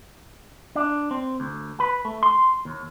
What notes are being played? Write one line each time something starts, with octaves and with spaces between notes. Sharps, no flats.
D4
C4
D2
B4
A3
C6
D#2